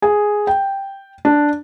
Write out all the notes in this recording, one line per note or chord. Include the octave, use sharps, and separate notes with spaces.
G#4
G5
D4